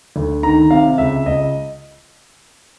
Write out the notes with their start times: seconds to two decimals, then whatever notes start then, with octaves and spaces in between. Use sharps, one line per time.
0.16 D2
0.43 D#3 A#5
0.71 C3 F5
0.98 C#2 E5
1.26 C#2 D#5